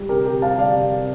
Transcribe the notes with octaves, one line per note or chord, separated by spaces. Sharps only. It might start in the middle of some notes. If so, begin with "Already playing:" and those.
Already playing: G3
C3 G4 A#4
G4 A#4
G3 F5 A5
D5 F5
C3